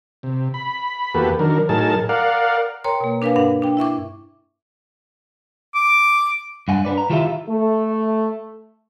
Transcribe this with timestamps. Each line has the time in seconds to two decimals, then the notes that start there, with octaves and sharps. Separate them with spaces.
0.23 C3
0.54 B5
1.14 E2 A#3 F#4 G4 A4 B4
1.39 D#3 F#3 D4 A#4
1.69 A2 F#3 D#4 G#4 A#4 A5
2.09 A#4 D5 F5 F#5
2.84 A#4 C#5 G5 A#5 C6
3.01 B2 A#3
3.22 D4 A#4 B4 F5 G#5
3.36 G2 D4 F#5
3.62 D4 G5
3.77 E4 E5 C#6 D6
5.75 D6
6.68 G2 F#5 G#5
6.85 D4 B4 D5
6.98 A#5
7.10 D#3 E4 F4 G4 A4 E5
7.49 A3